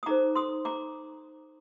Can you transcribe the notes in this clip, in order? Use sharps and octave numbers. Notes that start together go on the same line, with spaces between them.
D#6
D#4 A4 C5 A#5 D6
C6 D#6
A#5 D6